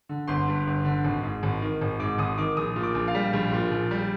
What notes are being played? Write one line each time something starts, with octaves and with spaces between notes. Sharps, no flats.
D3
G1 C6
G2
G1
D3
G#1
G#2
G#1
D#3
G#1
G#2 D6
G#1 D#6
D#3 D6
A#1 D#6
A#2
D6
A#1
F5
G3
A#1
A#2
A#1
G3